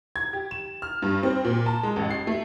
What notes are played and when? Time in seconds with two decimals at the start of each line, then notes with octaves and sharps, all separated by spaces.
0.16 G#6
0.33 G4
0.51 E7
0.82 F6
1.02 G2
1.23 C4
1.44 A#2
1.66 A5
1.83 G#3
1.96 A1
2.10 C7
2.27 A3